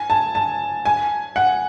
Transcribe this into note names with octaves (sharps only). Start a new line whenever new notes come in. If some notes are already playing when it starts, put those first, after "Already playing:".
Already playing: G#5
A5
A5
G#5
F#5